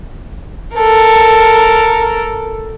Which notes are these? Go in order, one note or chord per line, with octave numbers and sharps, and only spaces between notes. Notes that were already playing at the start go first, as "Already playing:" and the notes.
A4 A#4